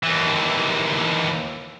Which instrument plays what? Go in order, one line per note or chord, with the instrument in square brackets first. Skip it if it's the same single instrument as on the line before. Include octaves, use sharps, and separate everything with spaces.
[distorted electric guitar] D#2 E3